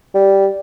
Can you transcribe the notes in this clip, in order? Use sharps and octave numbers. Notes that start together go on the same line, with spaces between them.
G3